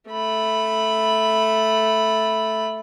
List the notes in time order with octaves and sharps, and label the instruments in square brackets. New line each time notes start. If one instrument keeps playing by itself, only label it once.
[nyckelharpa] A3 B5